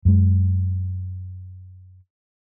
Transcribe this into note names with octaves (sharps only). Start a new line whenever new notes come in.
F#2 G#3